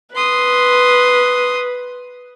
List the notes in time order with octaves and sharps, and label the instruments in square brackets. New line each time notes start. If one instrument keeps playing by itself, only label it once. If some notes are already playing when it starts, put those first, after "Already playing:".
[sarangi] B4 [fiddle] C6 D#6